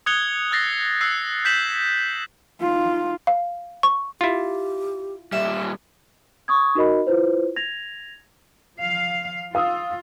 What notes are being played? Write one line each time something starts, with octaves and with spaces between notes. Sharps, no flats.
D#6 F#6 G#6 C#7 F7 G7
E6 F#6 A6 A#6 C7
E6 F#6 C7
G6 B6 E7 F#7
D#4 F4
F5
C#6
E4 F4 G4
A#2 G3 E5
C#6 D#6 G#6
D#4 F#4 A#4 D#5 B5
E4 F4 B4 C5
G#6 A#6 F7
F3 F5
F4 F5 D#6 E6